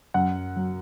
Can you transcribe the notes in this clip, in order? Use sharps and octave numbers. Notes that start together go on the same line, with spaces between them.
F#2 F#5
F#3